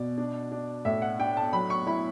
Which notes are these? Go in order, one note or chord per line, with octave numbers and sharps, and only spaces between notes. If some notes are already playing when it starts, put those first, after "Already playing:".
Already playing: B2 D5
D4
D4
A2 E5
F#5
D4 G5
A5
F#3 B5
C#6
E4 B5